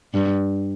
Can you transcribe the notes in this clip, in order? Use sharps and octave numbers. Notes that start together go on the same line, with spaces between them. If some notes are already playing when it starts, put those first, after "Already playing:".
G2